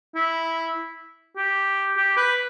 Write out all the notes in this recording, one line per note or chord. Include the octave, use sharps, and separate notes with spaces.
E4
G4
G4
B4